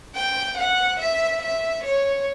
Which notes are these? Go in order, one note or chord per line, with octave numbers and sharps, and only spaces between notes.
G5
F#5
E5
E5
C#5